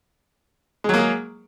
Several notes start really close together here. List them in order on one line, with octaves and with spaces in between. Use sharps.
G#3 F#3 A#3 G#4